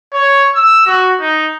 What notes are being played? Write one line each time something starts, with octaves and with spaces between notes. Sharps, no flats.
C#5
E6
F#4
D#4